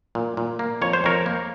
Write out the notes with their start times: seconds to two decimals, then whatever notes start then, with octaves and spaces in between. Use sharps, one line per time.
0.15 A#2
0.37 A#2
0.59 A#3
0.82 F2 C#5
0.93 C5
1.04 F2 A#4 C#5
1.26 A#3